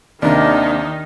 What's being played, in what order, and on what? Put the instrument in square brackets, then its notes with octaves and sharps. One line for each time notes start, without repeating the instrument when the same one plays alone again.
[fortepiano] D#2 C3 [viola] D#3 D#4 [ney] D4 [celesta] D5 A#5